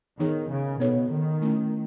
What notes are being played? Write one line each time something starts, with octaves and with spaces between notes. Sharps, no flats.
D#3 B3 D#4 G#4 C#5
C#3
B2 B3 D#4 A4 C#5
D#3
A3 C#4 E4